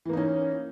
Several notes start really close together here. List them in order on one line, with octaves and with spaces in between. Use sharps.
E3 A#3 D#4 C#4